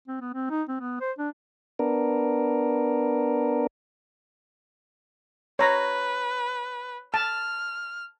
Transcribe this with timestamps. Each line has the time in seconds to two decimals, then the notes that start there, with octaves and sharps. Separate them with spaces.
0.08 C4
0.21 B3
0.34 C4
0.50 D#4
0.69 C4
0.80 B3
1.01 C5
1.18 D4
1.79 B3 D4 A#4
5.59 B4 C#5 A#5
7.14 A5 F6